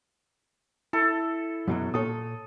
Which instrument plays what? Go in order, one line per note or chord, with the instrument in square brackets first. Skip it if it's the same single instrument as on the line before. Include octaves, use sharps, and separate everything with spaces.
[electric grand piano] E4 [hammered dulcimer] A4
[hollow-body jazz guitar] F#2 B2 F#3
[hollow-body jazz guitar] A#2 A4 C#5 [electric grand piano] D#6